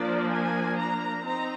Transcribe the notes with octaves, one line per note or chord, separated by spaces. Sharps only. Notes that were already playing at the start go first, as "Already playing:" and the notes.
Already playing: F3 A#3 D4 D5
G#5
A#5
C4 D#4 A#5